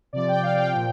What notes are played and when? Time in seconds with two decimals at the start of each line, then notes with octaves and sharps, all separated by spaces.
0.13 C3 F3 D5
0.28 G5
0.43 F5
0.58 G5
0.72 A#2 F3